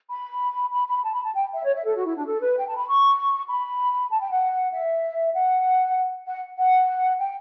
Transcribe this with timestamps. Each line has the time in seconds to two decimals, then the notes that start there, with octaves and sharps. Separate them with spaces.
0.10 B5
0.72 B5
0.88 B5
1.03 A5
1.13 B5
1.24 A5
1.34 G5
1.54 E5
1.65 C#5
1.74 E5
1.84 A4
1.95 F#4
2.05 E4
2.16 D4
2.26 A4
2.41 B4
2.57 G5
2.67 A5
2.77 B5
2.87 C#6
3.49 B5
4.11 A5
4.20 G5
4.31 F#5
4.73 E5
5.34 F#5
6.26 F#5
6.57 F#5
7.19 G5